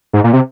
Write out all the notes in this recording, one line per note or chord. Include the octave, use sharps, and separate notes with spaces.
G#2
A#2
C3